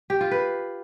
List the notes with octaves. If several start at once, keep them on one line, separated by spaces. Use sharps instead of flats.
G4
F4
B4